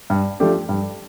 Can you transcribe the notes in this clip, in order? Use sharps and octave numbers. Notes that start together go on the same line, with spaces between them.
G2
F3 A3 D4 G4
G2